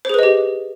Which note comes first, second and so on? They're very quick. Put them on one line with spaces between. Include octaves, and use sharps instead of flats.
C5 G#4 B4 D#5 G4